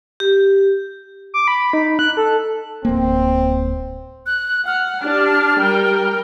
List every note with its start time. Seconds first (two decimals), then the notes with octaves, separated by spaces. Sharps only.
0.20 G4
1.34 D6
1.48 B5
1.73 D#4
1.99 F#6
2.17 A4
2.85 D1 A#3 C4
4.26 F#6
4.67 F#5 F6
5.02 D4 G4 A5
5.59 G3 A#4 G5